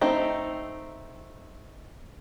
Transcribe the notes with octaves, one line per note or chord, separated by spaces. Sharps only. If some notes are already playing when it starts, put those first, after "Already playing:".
A3 C4 D#4